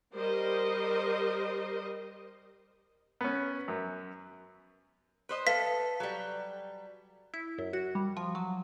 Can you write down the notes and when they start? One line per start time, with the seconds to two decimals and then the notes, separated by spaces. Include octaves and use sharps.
0.14 G3 A#4 C5 D#5
3.21 B3 C#4
3.68 F#2
5.29 B4 C5 D#5
5.47 A4 B4 F5 B6
6.00 F#3 G3
7.34 E4
7.58 F#2
7.73 F#4
7.95 G3
8.17 F3
8.35 F#3